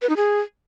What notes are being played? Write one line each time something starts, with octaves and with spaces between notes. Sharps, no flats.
B4
D#4
G#4